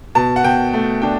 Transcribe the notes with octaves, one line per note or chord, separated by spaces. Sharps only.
B2 A5
F#5
B2 G5
A3
D4 G5